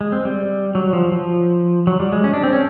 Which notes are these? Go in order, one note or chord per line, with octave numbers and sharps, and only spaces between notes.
G#3
C4
G3
F#3
F3
F3
F#3
G3
G#3
C#4
D4
C4
C#4